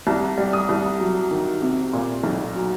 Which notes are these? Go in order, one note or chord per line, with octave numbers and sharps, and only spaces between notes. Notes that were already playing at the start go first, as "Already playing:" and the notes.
C2 A5
G3
D#6
C2
F#3
D#3
C3
A#2
B1
F#3